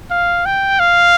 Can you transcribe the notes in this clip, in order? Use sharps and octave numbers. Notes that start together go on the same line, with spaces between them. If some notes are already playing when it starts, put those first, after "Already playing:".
F5
G5
F5